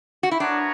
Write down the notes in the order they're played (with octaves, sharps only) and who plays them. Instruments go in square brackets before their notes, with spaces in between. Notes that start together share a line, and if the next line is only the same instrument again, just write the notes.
[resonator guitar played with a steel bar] F#4
E4
[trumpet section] B3 F#4 A#4 C#5 F#5 [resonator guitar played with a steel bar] D4